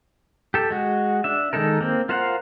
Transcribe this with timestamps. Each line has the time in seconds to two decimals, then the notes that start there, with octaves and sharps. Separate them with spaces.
0.54 G4 A4
0.70 G#3 F#4
1.24 D4 E5
1.53 D#3 G#3 D#4 A4 A#4
1.81 A#3 C4
2.09 F4 A#4 C5 F5 F#5